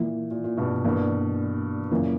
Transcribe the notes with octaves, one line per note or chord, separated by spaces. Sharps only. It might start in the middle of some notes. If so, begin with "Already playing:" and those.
Already playing: A#2 E3 A#3 E4
A#2
A#2
G2 B2
G2 B2 E3 A#3 D4
F#2 A#2 C#3 E3 A#3